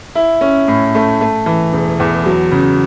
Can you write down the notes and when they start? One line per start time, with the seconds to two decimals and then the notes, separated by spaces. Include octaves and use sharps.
0.15 E4
0.41 C#4
0.68 A2
0.95 A3
1.21 A3
1.46 E3
1.73 E1
2.00 E2
2.26 F#3
2.52 C#3